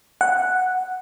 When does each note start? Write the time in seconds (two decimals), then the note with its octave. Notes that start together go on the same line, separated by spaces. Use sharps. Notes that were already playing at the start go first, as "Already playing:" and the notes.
0.21 F#5